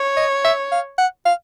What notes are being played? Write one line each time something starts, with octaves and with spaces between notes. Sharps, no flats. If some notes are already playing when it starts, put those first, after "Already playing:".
Already playing: C#5
D#5
E5
F5
F#5
F5